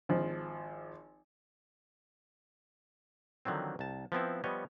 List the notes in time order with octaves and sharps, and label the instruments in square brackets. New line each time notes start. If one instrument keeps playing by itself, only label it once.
[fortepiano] G#1 F3
[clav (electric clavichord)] D3 D#3 F3 F#3 C4
C2 A5
F3 B3 C4 E4
F3 G3 B3 C#5 D#5